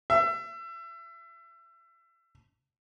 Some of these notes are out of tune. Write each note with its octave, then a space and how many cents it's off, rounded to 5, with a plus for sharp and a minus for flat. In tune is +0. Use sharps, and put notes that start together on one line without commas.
E5 +30